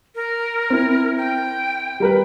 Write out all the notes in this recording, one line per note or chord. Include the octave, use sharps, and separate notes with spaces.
A#4
C4 E4
G5
G3 A#4 B4